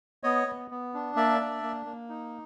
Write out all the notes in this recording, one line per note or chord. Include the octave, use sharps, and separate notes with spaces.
B3 C#5 D#5
B3
B3
D4
A#3 D5 E5
D4
A#3
A#3
D#4